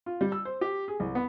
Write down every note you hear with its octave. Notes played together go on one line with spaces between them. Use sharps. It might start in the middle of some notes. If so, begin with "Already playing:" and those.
F4
G3
E6
C5
G4
G#4
C2
B3